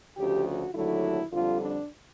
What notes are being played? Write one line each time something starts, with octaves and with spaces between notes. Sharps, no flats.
D2 C#3 F3 G4
F#4
D#2 D3 F#3 A3 E4
F2 D3 G3 F4
D4